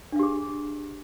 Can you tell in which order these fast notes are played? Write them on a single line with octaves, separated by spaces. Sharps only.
D4 F5 G4 G#4